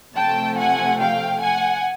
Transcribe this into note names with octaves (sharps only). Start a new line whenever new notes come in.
C3 F3 A3 G5 A5
F#5 G#5
F5 G5
F#5 G#5